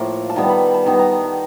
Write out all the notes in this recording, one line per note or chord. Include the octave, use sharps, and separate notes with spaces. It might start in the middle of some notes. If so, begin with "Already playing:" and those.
Already playing: A2 F3 A#3 E5
A5
D#3 G3 B3 A#5
B5
A5
D#3 G3 B3 A#5
A#5
A5
A#5